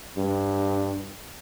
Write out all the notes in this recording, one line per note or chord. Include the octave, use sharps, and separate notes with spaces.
G2